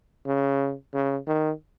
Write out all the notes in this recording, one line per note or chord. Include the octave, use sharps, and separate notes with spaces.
C#3
C#3
D#3